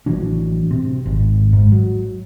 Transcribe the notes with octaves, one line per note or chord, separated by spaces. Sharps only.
A1 E3 F#3 D4
C3
G#1
G#2
F#3